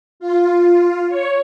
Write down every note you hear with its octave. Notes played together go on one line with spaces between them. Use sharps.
F4
C#5